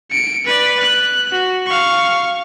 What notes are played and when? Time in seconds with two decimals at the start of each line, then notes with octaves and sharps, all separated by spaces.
0.12 C#7 D7
0.45 B4 D5
0.80 F#6
1.32 F#4
1.66 F5 C#6